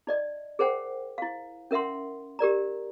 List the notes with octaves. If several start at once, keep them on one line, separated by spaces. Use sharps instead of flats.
D#4 D5 D#5
G#4 A#4 C5 F#5 G5
E4 F5
C#4 A#4 E5 F#5 C6
G4 A#4 D5 A#5